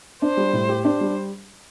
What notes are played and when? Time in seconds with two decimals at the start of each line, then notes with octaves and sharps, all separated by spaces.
0.22 D4 C5
0.37 G3
0.53 A2
0.69 G4
0.85 D4 C5
1.01 G3